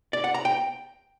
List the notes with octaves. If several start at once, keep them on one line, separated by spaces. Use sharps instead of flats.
D5
F#5
A#5
G5